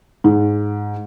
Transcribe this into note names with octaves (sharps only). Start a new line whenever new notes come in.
G#2